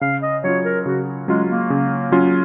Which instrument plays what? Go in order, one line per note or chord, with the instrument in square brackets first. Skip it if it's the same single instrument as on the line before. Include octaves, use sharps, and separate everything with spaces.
[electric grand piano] C#3 [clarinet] F5
[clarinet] D#5
[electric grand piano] F#3 C#4 F4 [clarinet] C#5
[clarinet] A#4
[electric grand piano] C#3 [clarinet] F#4
[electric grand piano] F#3 C#4 F4 [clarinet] G#3
[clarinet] A#3
[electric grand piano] C#3
F#3 C#4 F4